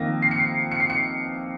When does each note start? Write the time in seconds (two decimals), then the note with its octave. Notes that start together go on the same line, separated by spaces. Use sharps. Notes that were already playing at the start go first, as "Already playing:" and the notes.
Already playing: F2 D#3 A#3 A#6
0.22 C7
0.31 C#7
0.39 C7
0.71 C#7
0.80 C7
0.90 C#7